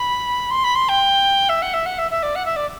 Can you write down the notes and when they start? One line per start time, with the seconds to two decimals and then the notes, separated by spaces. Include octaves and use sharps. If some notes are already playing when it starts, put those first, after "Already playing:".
Already playing: B5
0.50 C6
0.64 B5
0.75 C6
0.88 G5
1.49 E5
1.62 F#5
1.73 E5
1.86 F#5
1.98 E5
2.11 E5
2.22 D5
2.35 F#5
2.45 E5
2.56 D5